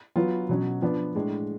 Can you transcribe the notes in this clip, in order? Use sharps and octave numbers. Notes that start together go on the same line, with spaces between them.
F#3 B3 F4
B2 F#3 C#4
F3 B3 D4
A2 G#3 D4